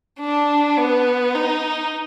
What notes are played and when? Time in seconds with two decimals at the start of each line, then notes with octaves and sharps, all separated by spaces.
0.20 D4
0.78 B3
1.35 D#4